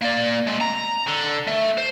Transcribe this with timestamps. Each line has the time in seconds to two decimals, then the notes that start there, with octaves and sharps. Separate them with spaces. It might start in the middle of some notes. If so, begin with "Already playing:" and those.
0.02 A#3 D5
0.47 G#3 C4
0.61 A#5
1.08 D3
1.48 A3
1.78 C5